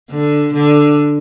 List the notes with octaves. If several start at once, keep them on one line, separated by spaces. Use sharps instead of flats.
D3
D3